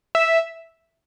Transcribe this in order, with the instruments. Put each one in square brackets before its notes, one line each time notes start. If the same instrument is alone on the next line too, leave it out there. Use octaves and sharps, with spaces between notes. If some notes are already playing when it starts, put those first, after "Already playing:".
[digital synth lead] E5